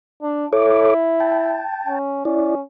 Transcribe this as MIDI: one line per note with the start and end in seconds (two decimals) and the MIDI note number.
0.22 0.46 62
0.53 1.63 64
0.53 0.94 69
0.53 0.94 73
0.53 0.94 86
1.20 1.99 79
1.20 1.99 81
1.86 2.23 61
2.25 2.62 61
2.25 2.55 64
2.25 2.55 74